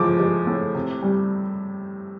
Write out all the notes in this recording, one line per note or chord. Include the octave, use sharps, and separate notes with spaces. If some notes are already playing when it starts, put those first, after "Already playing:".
Already playing: A2 F3 G#3 D6
G#3
A2
C3
G3